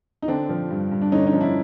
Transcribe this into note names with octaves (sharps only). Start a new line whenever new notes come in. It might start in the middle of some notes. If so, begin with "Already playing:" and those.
D#4
D3 C4 D4
F3
G2
G2
D4
D3 C#4 D#4
C#4 D#4
F3
D4 E4